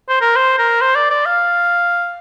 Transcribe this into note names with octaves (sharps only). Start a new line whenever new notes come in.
C5
A#4
C5
A#4
C5
D5
D5
F5